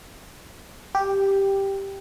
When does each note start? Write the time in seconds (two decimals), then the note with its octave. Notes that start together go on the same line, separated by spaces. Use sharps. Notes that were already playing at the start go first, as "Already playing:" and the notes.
0.95 G4